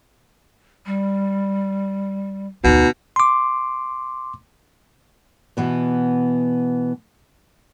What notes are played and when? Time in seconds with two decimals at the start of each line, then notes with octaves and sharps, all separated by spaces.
0.86 G3
2.64 D2 B2 D3 D#4
3.16 C6 D6
5.57 B2 E3 B3